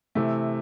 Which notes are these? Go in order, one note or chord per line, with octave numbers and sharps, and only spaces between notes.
C3 E3 A3